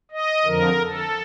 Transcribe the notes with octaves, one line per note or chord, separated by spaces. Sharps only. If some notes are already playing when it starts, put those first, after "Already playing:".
D#5
F2 D3 F3 A#4
A4